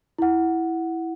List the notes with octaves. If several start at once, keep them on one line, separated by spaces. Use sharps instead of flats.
E4 F#5